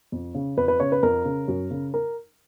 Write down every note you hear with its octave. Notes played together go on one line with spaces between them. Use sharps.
F2
C#3
F2 B4
B4
C#3 C#5
B4
F2 A#4
C#3
F#2
C#3
A#4